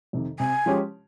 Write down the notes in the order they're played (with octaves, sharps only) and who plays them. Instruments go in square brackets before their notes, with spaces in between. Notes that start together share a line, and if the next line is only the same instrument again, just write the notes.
[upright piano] F2 C3 D#3
[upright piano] C3 [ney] G#5
[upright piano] F3 G#3 C#4 G4